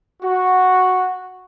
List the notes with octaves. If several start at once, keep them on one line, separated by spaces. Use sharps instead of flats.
F#4